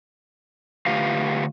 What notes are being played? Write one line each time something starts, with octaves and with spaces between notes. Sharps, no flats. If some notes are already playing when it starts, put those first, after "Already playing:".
D3 A3 F4 G4 B4 F5